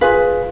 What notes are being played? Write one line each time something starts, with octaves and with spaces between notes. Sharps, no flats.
F4 G#4 B4 F5